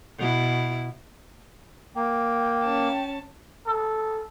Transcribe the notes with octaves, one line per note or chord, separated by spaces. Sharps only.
B2 E4
A#3 G5
C#4 A5
A4